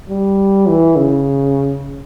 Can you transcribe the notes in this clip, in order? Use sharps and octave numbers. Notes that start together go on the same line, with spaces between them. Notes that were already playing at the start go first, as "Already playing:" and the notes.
G3
E3
C#3